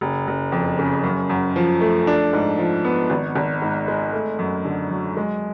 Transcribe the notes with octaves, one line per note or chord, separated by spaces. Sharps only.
F#1
F#1
F2
C#3
F#2
F#2
F3
A3
D4
G#2
F3
B3
G#1
G#1
G#2
G#3
A3
F#2
D3
F#3
G#3